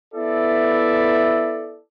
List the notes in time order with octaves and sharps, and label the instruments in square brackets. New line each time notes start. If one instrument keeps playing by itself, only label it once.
[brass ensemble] B3 E4 A4 D5 E5